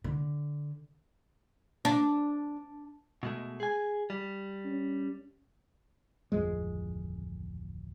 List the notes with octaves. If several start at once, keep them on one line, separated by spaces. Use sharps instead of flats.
D3
D4
B2 G#3 A3
G#4 G#5
G3
C#4
D1 G#1 F2 G#3